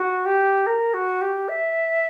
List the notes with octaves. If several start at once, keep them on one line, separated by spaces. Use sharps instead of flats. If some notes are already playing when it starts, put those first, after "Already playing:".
Already playing: F#4
G4
A#4
F#4
G4
E5